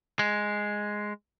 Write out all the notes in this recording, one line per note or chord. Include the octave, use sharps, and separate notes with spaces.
G#3